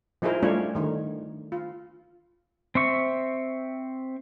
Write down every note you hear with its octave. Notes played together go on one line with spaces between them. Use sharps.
F3 D#4 E4 G#4 A#4 C5
G3 A3 C#4 D4 F4 C#5
D3 D#3
F4
C4 E5 C#6